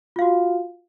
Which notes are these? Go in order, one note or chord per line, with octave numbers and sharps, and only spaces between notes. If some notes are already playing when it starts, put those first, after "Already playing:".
F4 F#4 F5